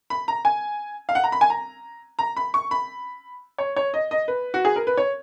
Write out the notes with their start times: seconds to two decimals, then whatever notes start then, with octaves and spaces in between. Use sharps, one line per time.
0.10 B5
0.28 A#5
0.45 G#5
1.09 F5
1.15 F#5
1.24 A#5
1.32 B5
1.41 G#5
1.50 A#5
2.19 A#5
2.37 B5
2.54 C#6
2.71 B5
3.58 C#5
3.76 C#5
3.94 D#5
4.11 D#5
4.28 B4
4.54 F#4
4.65 G#4
4.76 A#4
4.87 B4
4.97 C#5